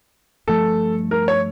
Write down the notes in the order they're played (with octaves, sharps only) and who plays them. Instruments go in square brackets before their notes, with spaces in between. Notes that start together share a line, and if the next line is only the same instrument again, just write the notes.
[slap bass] G2 F3 A3 [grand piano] A4
[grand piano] A#4
C#5